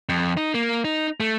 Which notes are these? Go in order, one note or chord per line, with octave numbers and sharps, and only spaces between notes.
F2
D#4
A#3
D#4
A3